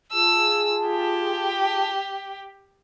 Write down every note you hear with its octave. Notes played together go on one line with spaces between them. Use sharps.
F4 G#4 A5 E6
G4